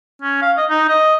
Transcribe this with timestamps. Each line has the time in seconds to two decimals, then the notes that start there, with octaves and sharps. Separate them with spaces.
0.22 C#4
0.42 F5
0.57 D#5
0.70 D#4
0.88 D#5